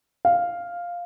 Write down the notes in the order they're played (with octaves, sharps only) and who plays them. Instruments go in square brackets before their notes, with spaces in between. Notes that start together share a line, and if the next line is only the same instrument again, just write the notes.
[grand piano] F5